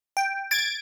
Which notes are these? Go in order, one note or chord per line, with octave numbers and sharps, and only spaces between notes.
G5
G#6 A6 D7